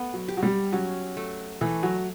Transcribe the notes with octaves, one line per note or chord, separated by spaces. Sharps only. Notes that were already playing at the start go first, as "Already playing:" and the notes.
Already playing: A3 B3
F#3
G4
F#3
G3
F#3 C#4
A3
E3 A3
F#3